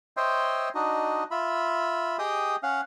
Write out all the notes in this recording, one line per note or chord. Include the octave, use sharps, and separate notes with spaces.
C5 C#5 D#5 E5 G5 C6
D4 D#4 F#4 D#5
F4 E5 B5
G4 G#4 D#5 G5 D#6
C#4 F5 F#5